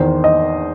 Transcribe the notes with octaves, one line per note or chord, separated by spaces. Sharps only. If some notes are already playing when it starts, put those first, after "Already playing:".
Already playing: E2 D#3 C5
D#5